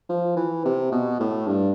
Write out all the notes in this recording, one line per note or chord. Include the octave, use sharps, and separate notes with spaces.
F3
E3
C3
B2
A2
G2